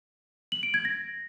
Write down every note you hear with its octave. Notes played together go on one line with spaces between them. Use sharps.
F#7
D7
G#6
A#6